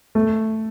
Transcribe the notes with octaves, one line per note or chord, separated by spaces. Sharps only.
A3